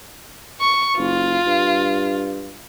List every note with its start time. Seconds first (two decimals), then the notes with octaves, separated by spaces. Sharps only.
0.60 C#6
0.98 F#1 F4
1.47 G2